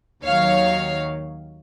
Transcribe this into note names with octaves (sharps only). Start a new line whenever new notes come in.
D#2 D#3 F#3 C#5 F5